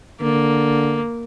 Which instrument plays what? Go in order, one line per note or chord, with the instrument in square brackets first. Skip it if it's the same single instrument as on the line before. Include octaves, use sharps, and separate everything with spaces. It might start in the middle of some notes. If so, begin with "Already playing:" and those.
[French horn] D3 [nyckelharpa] A#3